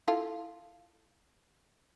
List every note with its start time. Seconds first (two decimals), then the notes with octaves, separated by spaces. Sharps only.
0.08 E4 F4 A4